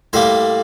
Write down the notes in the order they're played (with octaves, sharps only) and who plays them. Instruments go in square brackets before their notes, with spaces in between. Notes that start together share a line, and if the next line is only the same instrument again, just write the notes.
[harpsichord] A2 G3 A#3 C5